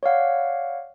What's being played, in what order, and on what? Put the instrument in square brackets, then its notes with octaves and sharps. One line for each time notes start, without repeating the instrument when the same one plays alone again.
[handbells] C#5 D5 F5 F#5